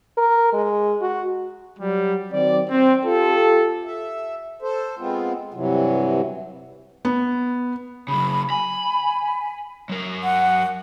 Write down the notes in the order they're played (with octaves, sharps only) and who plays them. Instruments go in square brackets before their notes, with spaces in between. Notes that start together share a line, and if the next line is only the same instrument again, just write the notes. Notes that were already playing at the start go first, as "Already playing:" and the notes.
[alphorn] A#4
G#3
F#4
[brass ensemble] F#3 G3
D#3 F#3 C4 D5
C4
F4 G4 A4
[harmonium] E5
A4 C5
G#3 B3 C4 F4
G2 C3 E3 F#3
[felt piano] B3
[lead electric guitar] C#3 F#3 [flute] B5
[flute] G#5 [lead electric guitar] B5
[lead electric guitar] F#3 A#4
[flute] F#5